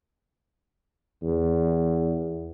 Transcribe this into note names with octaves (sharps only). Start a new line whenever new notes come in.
E2